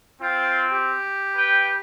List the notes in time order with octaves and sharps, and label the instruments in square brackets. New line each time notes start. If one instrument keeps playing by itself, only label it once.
[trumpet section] C4 [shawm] F4
[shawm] G4
[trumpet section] B4 G5